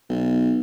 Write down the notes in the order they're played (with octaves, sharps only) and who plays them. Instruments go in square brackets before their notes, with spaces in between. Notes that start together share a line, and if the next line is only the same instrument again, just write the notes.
[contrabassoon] B1